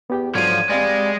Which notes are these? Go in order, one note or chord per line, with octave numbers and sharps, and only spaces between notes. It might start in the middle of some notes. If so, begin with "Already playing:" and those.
E2 B3 G4 G5
G#2 D3 F3 F#3 C#5 G#6 D#7
G3 G#3 C4 F5 A6